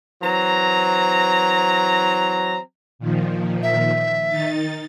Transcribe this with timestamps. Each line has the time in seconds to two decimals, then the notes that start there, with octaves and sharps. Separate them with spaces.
0.21 E3 F#3 C4 A#5
2.99 A#2 D#3 F3
3.63 E5
4.28 D#3 D#4 A6